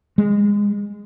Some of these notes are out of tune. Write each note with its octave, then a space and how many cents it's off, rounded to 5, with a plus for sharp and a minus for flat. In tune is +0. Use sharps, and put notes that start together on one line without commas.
G#3 -25